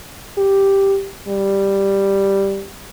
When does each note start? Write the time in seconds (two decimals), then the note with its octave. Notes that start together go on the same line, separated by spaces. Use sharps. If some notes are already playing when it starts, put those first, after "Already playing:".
0.38 G4
1.28 G3